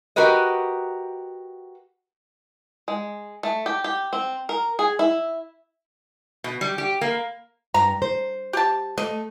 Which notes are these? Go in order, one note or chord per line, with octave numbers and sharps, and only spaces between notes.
F#4 G4 A#4 B4 D#5
G#3
A3
G4
G4
C4
A#4
G#4
E4
B2
G3
G4
A#3
G2 A#5
C5
G4 A5
A3 D#5